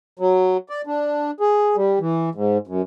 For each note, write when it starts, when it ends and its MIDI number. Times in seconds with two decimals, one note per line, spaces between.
0.19 0.57 54
0.69 0.82 74
0.87 1.31 62
1.40 1.76 68
1.76 1.99 55
2.00 2.29 52
2.35 2.58 44
2.67 2.82 42